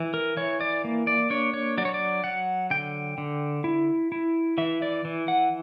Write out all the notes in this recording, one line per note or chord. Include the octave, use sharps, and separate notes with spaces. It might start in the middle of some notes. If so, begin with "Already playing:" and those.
Already playing: E3
A#4
E3 C#5
D5
A#3
D5
D4 C#5
C#5
F#3 D5
C#5
D5
F#3 F#5
D3 G5
D3
E4
E4
E3 E5
D5
E3
F#5